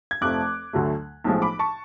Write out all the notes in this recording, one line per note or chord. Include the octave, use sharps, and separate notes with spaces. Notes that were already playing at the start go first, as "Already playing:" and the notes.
G#6
F1 F2 F3 A3 D6 F#6
D2 D3 F#3 A3
B1 A2 F3 G#3
B5 D6
A5 C#6